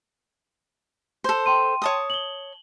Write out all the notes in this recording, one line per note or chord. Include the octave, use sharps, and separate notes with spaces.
A4 C5
G5 C6 D#7
C#5 A5 D#6
F#7 G7